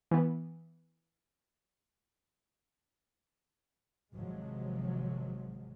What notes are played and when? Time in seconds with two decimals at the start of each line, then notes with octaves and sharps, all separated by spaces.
0.11 E3 B3
4.15 G#1 C3 F3 F#3 G#3